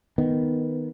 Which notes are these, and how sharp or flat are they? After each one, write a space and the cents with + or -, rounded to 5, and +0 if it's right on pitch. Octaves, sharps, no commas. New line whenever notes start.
D#3 +0 B3 +0